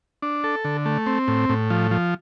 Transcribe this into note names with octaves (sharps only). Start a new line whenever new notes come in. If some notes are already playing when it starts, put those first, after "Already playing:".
D4
A4
D3
A3
C4
A2
A2
F3
F3